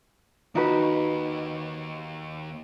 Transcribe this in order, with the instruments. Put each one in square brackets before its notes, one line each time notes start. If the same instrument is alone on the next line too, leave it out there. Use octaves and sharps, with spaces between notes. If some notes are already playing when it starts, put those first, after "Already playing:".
[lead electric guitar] D#2 [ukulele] D#4 F#4 B4